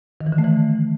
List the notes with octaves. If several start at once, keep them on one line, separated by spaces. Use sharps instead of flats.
D#3
E3
D3
A3
E3